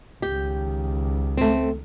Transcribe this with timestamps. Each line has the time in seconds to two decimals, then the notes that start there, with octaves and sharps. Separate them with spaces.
0.22 C#2 D#3 G4
1.37 A3 C4